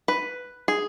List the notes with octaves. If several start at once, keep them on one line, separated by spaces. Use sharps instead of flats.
B4
G#4